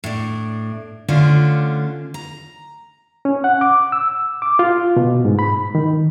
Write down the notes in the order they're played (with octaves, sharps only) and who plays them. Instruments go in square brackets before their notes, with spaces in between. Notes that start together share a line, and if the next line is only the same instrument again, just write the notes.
[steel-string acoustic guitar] A2 D4
D3 A3 C#4 D4 F4 C5
A#5
[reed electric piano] C#4
F#5
D6
E6
D6
F4
B2
G#2
B5
D#3